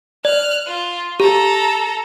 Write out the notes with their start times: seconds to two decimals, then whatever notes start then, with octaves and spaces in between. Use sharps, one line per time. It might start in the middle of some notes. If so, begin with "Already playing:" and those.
0.25 D5 F6 F#6
0.67 F4
1.20 G4 A4 A#5